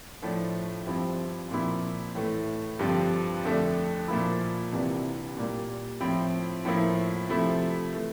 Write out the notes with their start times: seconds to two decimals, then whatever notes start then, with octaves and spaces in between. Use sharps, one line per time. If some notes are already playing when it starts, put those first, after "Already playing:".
0.22 A2 F3 A3 D4
0.86 G2 F3 C4 E4
1.51 A#2 F3 C4 E4
2.15 A2 E3 A3
2.79 G2 D3 F3 C4
3.44 F2 D3 A3 D4
4.08 A#2 F3 A#3 E4
4.73 C2 C3 E3 A#3 D4
5.37 A#2 G3 A#3
6.00 A2 F3 C4 E4
6.65 A2 F3 A#3 E4
7.29 C3 F3 A3 E4
7.94 E3 A3